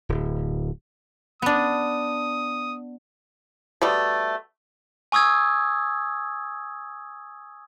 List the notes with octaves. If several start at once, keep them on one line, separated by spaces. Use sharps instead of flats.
D1
B3 D4 D#6
B2 G3 A3
G#5 C#6 D#6 E6 G#6